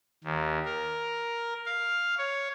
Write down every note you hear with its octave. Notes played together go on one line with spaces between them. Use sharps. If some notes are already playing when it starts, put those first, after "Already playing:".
D#2
A#4
F5
C#5